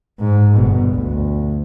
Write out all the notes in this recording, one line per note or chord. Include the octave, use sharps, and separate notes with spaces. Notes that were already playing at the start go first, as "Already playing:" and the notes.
G#2
G1 B2
D2